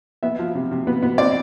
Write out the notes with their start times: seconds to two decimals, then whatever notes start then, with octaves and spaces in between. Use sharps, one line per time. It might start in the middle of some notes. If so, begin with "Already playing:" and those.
0.23 B3 E5
0.39 F3
0.55 C3
0.71 C3
0.87 B3
1.03 B3
1.18 C4 D5